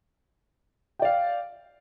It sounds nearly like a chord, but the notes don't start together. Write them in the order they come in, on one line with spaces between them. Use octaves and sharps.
G5 D5 F5